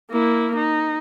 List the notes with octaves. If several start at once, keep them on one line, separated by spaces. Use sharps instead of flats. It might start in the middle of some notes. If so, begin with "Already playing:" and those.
A#3 E4
D#4